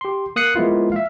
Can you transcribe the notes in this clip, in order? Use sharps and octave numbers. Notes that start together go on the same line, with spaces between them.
G4 C6
A#3 D#6 F#6 C7 C#7
F3 G#3 A#3 B3 E4 F4
E5 F5